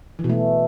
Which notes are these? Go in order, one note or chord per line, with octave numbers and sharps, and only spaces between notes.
E3
B2
A3